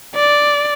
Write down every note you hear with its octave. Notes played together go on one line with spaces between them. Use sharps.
D5